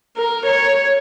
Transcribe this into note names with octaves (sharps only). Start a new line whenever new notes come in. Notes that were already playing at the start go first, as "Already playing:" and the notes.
A#4
C#5